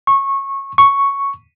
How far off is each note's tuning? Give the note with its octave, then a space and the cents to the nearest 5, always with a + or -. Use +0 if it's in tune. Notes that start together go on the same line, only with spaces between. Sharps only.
C#6 -20
C#6 +0